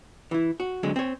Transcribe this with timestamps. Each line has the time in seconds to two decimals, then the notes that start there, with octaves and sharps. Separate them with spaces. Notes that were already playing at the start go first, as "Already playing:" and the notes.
0.31 E3 E4
0.60 F#4
0.83 D3 F#3 G#3 C4
0.96 C4 C#5